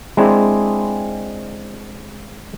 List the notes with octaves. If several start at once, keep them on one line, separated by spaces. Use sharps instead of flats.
G#3 C4 D4 E4 G#4